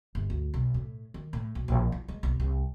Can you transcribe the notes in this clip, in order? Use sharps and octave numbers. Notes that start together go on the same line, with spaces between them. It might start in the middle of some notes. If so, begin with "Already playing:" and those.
G1
D2
B1
A2
D#3
A2
B1
A#1
E4
G#3
B1
C2